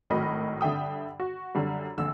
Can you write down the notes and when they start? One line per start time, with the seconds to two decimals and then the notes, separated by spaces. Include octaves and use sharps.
0.10 G#1 A2 F#3 A#4 D#5 B5
0.61 G2 D3 E5 G5 D#6
1.20 F#4
1.55 F#2 D3 G3
1.98 A#1 D3 E6